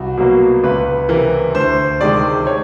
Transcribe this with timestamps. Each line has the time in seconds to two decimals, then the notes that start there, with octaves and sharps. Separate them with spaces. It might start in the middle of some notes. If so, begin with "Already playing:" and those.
Already playing: C2 F#4
0.17 B2 F#3 A#3
0.64 C#2 B4
1.09 C3 E3 A#4
1.54 D2 C5
2.01 C3 D#3 G#3 D5
2.47 C#5